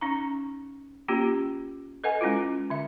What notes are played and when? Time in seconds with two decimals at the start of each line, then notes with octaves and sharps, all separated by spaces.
0.01 C#4 D#4 A#5
1.08 A#3 C#4 F4 G4
2.04 A4 B4 D#5 F#5 G#5
2.21 G#3 C#4 E4 F4
2.70 D3 E5